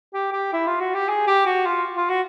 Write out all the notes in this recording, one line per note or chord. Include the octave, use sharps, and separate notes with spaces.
G4
G4
E4
F4
F#4
G4
G#4
G4
F#4
F4
F4
F#4